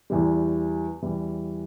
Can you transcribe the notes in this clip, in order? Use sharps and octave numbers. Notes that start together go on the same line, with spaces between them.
E2 E3 G3
E2 E3 G3